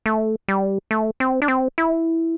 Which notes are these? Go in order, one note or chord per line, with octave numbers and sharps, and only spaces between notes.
A3
G3
A3
C4
D4
C4
E4